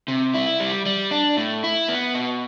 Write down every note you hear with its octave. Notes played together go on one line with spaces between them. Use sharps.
C3
E4
G3
G3
D4
A2
E4
B3
B2